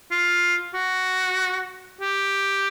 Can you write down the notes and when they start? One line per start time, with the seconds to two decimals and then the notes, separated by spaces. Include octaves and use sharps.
0.11 F4
0.74 F#4
2.00 G4